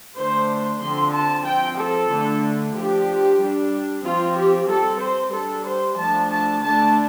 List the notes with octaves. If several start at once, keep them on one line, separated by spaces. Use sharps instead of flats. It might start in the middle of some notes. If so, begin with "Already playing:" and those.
D3 A3 D4 C5
D3 F3 C4 C6
A5
F3 C4 G5
A4
D3 A3 D4
F3 D4 G4
G3 D4
F3 C4 F4
G4
G3 C4 A4
C5
G3 D4 A4
C5
F3 A3 D4 A5
A5
D3 A3 D4 A5